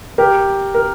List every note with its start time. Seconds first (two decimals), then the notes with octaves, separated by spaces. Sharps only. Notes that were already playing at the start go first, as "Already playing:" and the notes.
0.18 G4 A#4
0.74 A#4